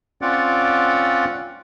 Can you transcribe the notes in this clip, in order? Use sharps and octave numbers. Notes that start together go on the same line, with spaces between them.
C4 C#4 F4 D5 F#5